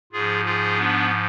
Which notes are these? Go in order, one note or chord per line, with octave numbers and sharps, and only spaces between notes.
G#2 F3 F4 G#4
F4 G#4
B3 D4